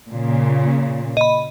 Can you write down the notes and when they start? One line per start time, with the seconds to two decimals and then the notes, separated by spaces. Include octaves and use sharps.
0.10 A#2 C#3
1.17 D#5 B5